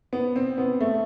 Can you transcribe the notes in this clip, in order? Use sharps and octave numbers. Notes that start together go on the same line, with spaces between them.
B3
C4
B3
A3